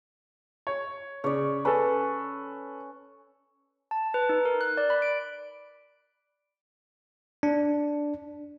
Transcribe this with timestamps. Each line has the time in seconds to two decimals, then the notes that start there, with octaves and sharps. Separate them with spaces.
0.67 C#5
1.24 C#3 C#5 D5
1.65 C#4 A4 B4
3.91 A5
4.14 B4
4.29 D#4
4.45 A#4
4.61 F#6
4.77 D5
4.90 B5
5.02 D7
7.43 D4